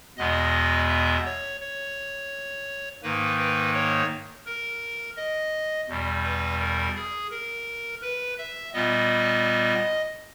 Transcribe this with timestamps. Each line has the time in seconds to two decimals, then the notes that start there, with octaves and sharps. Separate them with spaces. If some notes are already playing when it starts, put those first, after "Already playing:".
0.17 E2 B2 G#3 B3 D#5
0.89 E5
1.25 C#5
1.61 C#5
3.03 G#2 D#3 A#3 B4
3.38 B4
3.74 C#5
4.46 A#4
5.17 D#5
5.88 E2 B2 G3
6.24 B4
6.60 A#4
6.95 G#4
7.31 A#4
8.02 B4
8.38 E5
8.73 A#2 G3 B3 D#5